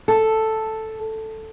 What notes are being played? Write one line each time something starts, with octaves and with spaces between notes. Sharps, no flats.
A4